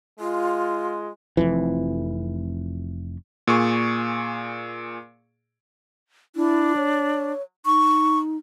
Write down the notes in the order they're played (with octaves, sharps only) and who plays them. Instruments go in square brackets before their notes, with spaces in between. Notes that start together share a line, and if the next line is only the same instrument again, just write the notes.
[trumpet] G#3 [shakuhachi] F4
[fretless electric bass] F1 F2 E3
[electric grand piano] A#2 G#4 C#6
[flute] D4 [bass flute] E4
[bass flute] C#5
[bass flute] D#4 [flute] C#6